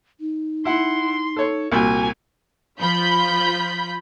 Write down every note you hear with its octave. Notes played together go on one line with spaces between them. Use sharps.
D#4
E4 F#5 C6
A4 C#5
C2 A#2 F#4 G#5
F3 F4 B5 G6 B6